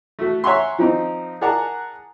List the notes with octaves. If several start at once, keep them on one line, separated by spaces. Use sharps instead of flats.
A3 F#4
C#5 E5 F#5 G#5 A#5 C6
F3 C4 D#4
G#4 A#4 D5 F#5 A5 A#5